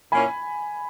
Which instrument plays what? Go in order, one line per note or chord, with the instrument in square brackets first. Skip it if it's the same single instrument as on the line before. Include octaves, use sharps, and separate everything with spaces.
[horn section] A#2 A#3 C#4 E4 [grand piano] G#5 B5